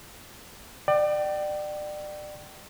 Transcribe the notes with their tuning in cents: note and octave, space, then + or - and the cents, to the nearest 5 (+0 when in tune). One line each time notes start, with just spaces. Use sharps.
D5 +30 G5 -35